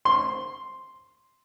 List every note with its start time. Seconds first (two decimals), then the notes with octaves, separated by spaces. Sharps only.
0.05 C6